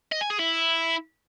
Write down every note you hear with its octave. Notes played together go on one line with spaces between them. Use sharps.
D#5
G#5
G#4
E4